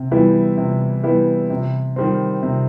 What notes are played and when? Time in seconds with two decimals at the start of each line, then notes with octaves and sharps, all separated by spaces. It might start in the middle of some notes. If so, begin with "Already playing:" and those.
Already playing: C3
0.11 E3 G3 B3 E4
0.58 C3
1.04 E3 G3 B3 E4
1.50 C3
1.96 D#3 G3 C4
2.43 C3